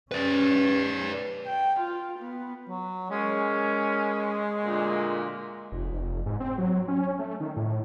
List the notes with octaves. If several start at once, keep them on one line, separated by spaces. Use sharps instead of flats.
C#4 B4 D5
G5
F4
B3
F#3
G#3 A#3 C#4
D2 A#2
F1
F1
G#2
C4
F#3
C#4
A3
D#3
A2